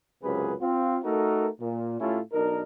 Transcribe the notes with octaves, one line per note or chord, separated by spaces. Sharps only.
C#2 F#2 C3 G#4 B4
C4 F4
A3 D#4 F#4 A4 A#4
A#2
A2 A3 C#4 E4 F4 G4
B1 D4 D#4 A#4